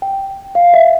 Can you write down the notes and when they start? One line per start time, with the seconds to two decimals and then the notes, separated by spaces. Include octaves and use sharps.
0.02 G5
0.55 F5
0.74 E5